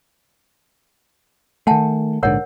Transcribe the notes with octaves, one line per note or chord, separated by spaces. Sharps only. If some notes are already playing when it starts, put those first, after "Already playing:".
D#3 A3 F#5 G#5 A5
A#1 G#2 D3 A#4 C#5 F#5